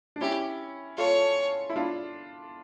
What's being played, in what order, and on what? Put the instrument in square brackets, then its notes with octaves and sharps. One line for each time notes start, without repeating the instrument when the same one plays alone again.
[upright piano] D4
[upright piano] C#4 E4 [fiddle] G4
[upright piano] F4 A4 [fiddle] C#5
[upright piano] E4
D4 F4